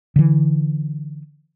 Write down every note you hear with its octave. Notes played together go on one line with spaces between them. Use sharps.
D3 E3